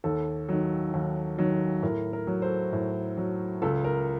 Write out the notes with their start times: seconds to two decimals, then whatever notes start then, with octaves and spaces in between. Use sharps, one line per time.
0.04 D#2 A4
0.49 D#3 F#3
0.94 D#2
1.38 D#3 F#3
1.83 A2 A#4
2.13 A#4
2.27 F#3
2.42 A4 C5
2.73 A2
3.17 F#3
3.62 C#2 A4
3.84 A#4